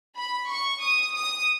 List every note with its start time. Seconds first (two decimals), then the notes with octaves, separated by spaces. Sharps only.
0.17 B5
0.50 C#6
0.83 D#6
1.15 D#6